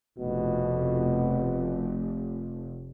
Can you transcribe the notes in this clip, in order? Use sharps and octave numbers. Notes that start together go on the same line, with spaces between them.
F1 B2